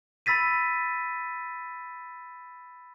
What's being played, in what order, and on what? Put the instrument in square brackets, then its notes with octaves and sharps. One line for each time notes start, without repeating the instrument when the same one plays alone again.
[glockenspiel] B5 E6 A6 B6 D#7